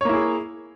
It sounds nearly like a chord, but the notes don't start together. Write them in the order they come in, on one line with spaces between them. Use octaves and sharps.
C#5 A#3 E4 G#4